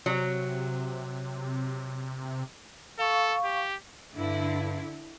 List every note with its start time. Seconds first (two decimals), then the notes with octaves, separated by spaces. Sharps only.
0.06 C3 F#3
2.99 A4 F5 C#6
3.44 G4
4.14 G2 D3 E4